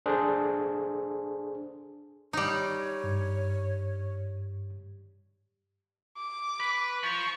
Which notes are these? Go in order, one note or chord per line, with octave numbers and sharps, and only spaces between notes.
D4 G#4 A4 C5
G3 D#4 C#5
G2
D6
B4
F3 C#6